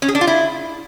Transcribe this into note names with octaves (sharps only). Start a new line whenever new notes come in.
C#4
G#4
D4
F4
E4